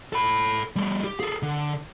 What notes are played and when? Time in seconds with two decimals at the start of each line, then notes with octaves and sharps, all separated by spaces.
0.13 A4 B5
0.76 G3 A3
1.04 G4
1.20 G#4 A4
1.43 D3